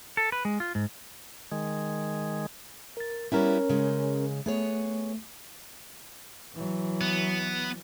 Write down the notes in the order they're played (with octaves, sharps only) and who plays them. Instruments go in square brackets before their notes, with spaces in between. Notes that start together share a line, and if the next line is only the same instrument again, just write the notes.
[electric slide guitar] A4
B4
G#3
F4
G#2
[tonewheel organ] D#3 G#3
[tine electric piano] A#4 A6
[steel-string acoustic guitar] G3 B3 E4 [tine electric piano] C#4 A#4 C#5
[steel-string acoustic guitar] C#3 G#3
[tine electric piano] A3 [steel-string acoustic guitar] B3 G#4 C#5
[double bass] E3 F#3
[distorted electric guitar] B3